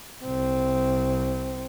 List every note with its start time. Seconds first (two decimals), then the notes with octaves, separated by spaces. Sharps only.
0.24 C2 C4